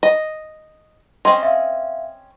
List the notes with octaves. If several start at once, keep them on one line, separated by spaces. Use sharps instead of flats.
D#5
C4 C#4 D#5 C6
E5 F5